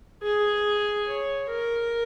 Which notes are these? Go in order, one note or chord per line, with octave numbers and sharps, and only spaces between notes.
G#4
C#5
A#4